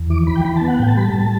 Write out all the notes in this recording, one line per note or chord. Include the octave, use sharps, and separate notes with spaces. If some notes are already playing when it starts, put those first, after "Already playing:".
Already playing: E2
E3 D6
E3 B5
G5
E3 B5
B3 A5
F#5
A2 G5
A5
G3 B5
A5
A2